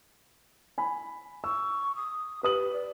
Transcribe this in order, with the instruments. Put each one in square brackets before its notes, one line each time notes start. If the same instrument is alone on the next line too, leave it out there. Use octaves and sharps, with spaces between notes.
[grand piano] G#5 B5
[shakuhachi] C#6 [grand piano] E6
[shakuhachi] D#6
[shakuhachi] G4 [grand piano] B4 D#6 F#7
[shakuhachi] D5